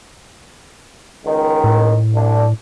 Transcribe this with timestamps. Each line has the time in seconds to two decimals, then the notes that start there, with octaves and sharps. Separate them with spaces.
1.25 C#2 D#3
1.64 A2
2.14 C2 D4